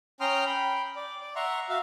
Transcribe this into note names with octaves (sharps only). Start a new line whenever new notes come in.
C#4 G5 A#5 C6 D#6 F6
G5 B5
D5
D5
E5 F#5 A#5 C6 C#6
F#4 E5 F5